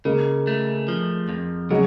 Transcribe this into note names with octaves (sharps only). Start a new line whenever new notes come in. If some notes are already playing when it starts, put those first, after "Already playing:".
C#3 G#3 A#3
A3
F3
F2
C#3 F#3 G#3